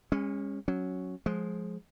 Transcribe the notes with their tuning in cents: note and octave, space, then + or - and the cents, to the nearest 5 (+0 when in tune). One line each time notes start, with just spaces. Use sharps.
G#3 -40 C#4 -15
F#3 +0 C#4 +0
F3 +20 G#3 +15